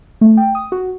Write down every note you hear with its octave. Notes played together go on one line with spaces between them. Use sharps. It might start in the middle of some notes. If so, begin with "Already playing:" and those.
A3
G5
D#6
F#4